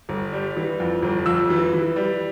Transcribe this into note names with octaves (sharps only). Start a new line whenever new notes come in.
G1
G3
E3
F2
G1
F2 E6
E3
E3
G3